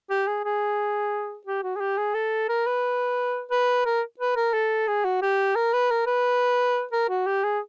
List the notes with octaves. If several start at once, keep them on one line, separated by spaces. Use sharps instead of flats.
G4
G#4
G#4
G4
F#4
G#4
G4
G#4
A4
A#4
B4
B4
A#4
B4
A#4
A4
G#4
F#4
G4
A#4
B4
A#4
B4
A#4
F#4
G4
G#4